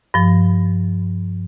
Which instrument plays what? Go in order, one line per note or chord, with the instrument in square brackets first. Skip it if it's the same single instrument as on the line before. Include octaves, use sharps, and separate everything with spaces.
[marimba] G2 F3